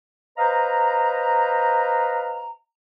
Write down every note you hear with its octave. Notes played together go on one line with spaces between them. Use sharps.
B4 C5 D#5 F5 A#5